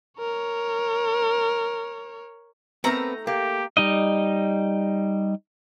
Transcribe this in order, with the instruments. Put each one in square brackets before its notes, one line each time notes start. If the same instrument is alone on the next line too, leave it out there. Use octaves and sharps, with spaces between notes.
[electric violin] A#4 C#5
[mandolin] A3 D#4 A#5 [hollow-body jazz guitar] B3 C4 A#4
[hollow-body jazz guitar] A#3 [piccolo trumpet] G4
[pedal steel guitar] G3 D#4 D#5